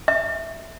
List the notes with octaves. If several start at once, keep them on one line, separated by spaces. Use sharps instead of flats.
E5